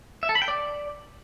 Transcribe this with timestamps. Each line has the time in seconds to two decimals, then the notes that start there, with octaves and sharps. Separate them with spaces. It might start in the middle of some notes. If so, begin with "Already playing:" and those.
0.23 E5
0.29 A4
0.35 B5
0.42 G5
0.48 D5